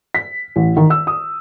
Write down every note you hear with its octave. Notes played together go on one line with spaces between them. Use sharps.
B6
A1
D#3
E6
D#6